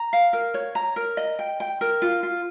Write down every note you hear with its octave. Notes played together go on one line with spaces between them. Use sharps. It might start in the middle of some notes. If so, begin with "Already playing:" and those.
Already playing: A#5
F5
A#4
C#5
A#5
A#4
D#5
G5
G5
A#4
F4
F4